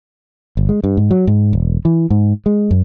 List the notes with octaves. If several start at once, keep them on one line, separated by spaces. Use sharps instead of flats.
G1
G#3
G2
G#2
F#3
G#2
E1
E3
G#2
G#3
F#2